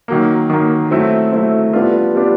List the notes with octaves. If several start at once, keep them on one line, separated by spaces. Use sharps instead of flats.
D#3 F#3 A#3
D#3 F#3 A#3
F#3 A3 C4 E4
F#3 A3 C4 E4
G3 B3 D4 F4
G3 B3 D4 F4